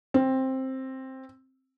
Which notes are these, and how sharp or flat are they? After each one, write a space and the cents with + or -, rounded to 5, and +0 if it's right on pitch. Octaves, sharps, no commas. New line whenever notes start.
C4 +10